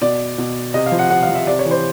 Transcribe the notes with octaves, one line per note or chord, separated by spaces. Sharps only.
B2 D5
B2
C3 D#5
F5
F3
F#5
C3 F#5
F5
F3
E5
C3 D5
C#5
E3
C5